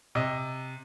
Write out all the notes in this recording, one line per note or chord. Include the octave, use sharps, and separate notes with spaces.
C3 D#5